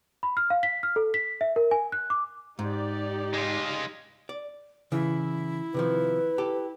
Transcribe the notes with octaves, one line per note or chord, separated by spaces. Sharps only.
B5
F6
F5
B6
F6
A4
B6
E5
A#4
G#5
F#6
D6
G#2 D#4 G4 D5
G#3 F4
D5
C#3 E3 E4
C3 D#3 F3 B4
G4 A4